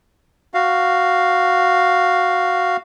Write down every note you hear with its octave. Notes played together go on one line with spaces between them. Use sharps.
F#4 F5